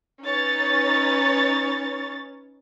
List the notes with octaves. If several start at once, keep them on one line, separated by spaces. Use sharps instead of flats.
C#4 D#4 B4 C#5 A6